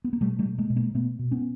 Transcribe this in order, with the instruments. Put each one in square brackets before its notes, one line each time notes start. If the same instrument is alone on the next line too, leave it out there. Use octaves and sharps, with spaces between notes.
[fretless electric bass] B3
A#3
B2 G3 A3
G3 A3
B2
G#3 A#3
B2
G#3 A#3
B2 A3 B3
B2
B3 C#4